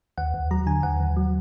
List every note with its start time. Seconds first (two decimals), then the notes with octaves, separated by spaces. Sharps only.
0.18 D#2 F#5
0.34 D#2
0.51 F#3 A#5
0.66 D3 G#5
0.83 D#2 F#5
1.00 D#2
1.17 F#3